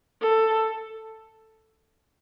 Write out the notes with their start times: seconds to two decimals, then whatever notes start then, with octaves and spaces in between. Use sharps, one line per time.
0.21 A4